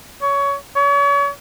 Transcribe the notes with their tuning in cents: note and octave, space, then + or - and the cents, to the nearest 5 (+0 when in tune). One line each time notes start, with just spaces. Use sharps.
C#5 +20
C#5 +40